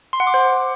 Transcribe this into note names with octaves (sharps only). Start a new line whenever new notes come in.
C6
F#5
D6
C5